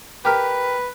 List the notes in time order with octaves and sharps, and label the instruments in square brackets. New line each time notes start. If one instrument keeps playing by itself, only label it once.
[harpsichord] G4 A#4 [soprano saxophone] B4